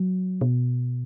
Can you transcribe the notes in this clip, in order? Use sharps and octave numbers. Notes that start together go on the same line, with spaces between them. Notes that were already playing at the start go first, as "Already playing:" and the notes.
Already playing: F#3
B2